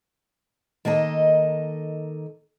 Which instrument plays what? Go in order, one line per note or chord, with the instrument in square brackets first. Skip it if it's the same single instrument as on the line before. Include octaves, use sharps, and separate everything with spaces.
[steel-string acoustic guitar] D#3 A#3 A4 D#5